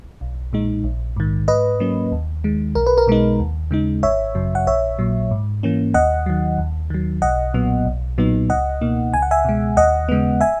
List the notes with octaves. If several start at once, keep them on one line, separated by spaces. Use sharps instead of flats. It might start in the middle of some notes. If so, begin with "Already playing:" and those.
B1
A#2 G#3 D#4
A#1
G#2 D#3
G#2 B4 D#5
F#3 A#3 C#4
D#2
D#3 G#3
B1 A#4
B4
A#4
B2 G#3 D#4
D#2
C#3 G#3 D#4
G#1 C#5 E5
F#2 C#3 F#3
F#5
A#1 C#5 E5
A#2 F#3
G#2
E3 A#3 C#4
D#2 D#5 F#5
D#3 F#3
D#2
D#3 F#3
B1 D#5 F#5
A#2 F#3 B3
B1
A#2 F#3 B3 D#4
C#2 D#5 F#5
B2 A#3 D#4
C#2 G#5
F#5
E5 G#5
B2 G#3
D#2 D#5 F#5
C#3 G#3 B3
E5 G#5